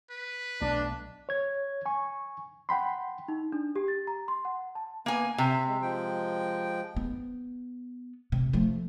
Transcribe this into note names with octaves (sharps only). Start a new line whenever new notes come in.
B4
B1 A3 D4
C#5 G#6
G#5 C#6
F#5 G5 B5 C6
D#4
D4
G4
A6
A#5
C6
F#5
A5
A#3 B3 G#5
C3 E5
G#3
F3 G#3 G5
B3
C3
F3 A3